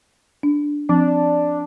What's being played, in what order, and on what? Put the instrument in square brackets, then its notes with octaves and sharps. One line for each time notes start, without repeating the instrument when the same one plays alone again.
[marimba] D4
[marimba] F3 C4 [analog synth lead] D4